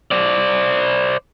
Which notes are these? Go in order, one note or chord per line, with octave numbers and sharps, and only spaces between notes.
C5 D5